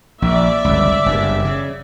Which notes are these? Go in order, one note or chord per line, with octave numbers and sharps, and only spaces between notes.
A#1 D5 E5
G1 C#2
F#1 G2
C#3